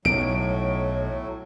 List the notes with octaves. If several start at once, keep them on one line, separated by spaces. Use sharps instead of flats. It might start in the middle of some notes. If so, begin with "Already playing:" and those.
B1 A2 F#3 D7